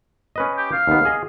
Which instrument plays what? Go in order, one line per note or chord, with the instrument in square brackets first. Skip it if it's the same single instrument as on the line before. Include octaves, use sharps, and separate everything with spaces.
[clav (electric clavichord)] C#4 B4 D#5
[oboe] G4
F5
[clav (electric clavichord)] D#2 B3
G#4 D#5